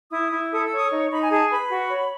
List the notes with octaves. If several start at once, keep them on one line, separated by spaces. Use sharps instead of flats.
E4 D#6
E4
A4 D#6
E6
C#5 D#6
D#4
D#4 B5
G#5
G#4 A5
B4 B5
F#4
C#5